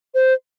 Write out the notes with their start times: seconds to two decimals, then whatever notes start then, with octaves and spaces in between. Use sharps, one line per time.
0.14 C5